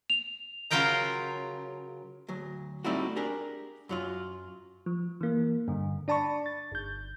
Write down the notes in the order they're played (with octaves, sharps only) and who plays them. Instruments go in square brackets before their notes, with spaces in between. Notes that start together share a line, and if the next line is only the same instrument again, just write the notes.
[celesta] F7
[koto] C#3 F#3 F4 A#4 G5 A#5
[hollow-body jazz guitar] D2 F#3
G3 A3 C4 D#4 E4 F#4
D4 G4 G#4 A#4
F#2 F#3 F4
[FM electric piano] F3
E3 A#3
G2 D3
D4 D5 A5 B5 C#6
A6
G1 G6